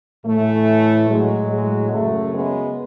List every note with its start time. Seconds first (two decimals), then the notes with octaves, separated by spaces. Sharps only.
0.24 A2 E3 A3
1.08 A2 F#3 G#3
1.50 G#3
1.91 F#2 C#3 F#3 A3
2.33 G#3 B3